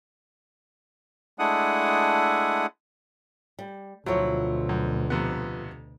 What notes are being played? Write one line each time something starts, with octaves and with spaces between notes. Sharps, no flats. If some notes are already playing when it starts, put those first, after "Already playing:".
G#3 A3 D4 E4 F#5 D#6
G3
D2 B2 F3 F#3 E4 F4 C#5
F#2
F2 C3 B3